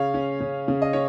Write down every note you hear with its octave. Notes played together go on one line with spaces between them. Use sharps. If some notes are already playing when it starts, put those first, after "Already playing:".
Already playing: C#3 C#5 F5
C#4
C#3
C#3
D#5
C#4 C#5